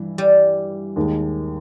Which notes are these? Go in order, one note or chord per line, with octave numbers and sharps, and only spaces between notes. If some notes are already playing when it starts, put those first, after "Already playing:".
Already playing: G2 E3
G3
D#2 D#3 G#3